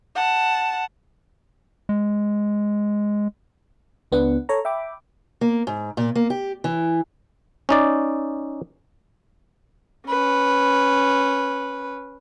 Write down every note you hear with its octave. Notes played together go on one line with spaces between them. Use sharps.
F#5 A5
G#3
C#2 B3 D4 F#5
A4 C#5 A#5
E5 G5 B5 D6
A#3
G#2
A#2
A#3
G4
E3
C#4 D#4 D5
C#4 B4